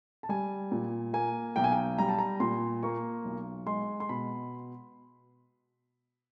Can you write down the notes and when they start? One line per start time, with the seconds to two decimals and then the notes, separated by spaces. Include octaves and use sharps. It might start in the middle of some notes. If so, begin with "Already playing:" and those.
0.23 A5
0.29 G3 G#5
0.72 A#2
1.13 A#3 G#5
1.56 B1 G5
1.64 G#5
1.72 G5
1.98 G3 A#5
2.09 A5
2.18 A#5
2.40 A#2 C6
2.83 A#3 C#6
3.25 B1
3.66 G#3 C6
4.00 C6
4.09 B2 B5